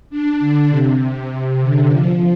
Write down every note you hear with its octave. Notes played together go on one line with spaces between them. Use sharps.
D4
D3
C3
C3
D3
F3